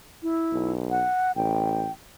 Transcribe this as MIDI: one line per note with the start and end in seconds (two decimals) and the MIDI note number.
0.23 0.73 64
0.53 1.05 35
0.91 1.32 78
1.36 1.88 33
1.36 1.92 79